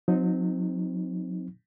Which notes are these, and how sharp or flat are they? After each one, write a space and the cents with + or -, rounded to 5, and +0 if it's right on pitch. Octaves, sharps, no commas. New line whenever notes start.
F#3 -40 C4 -15 D#4 +0